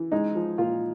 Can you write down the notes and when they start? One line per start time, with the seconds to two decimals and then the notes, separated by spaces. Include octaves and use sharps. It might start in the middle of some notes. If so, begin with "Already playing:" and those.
Already playing: E3
0.12 G#3 D#4
0.35 F3
0.58 A#2 F4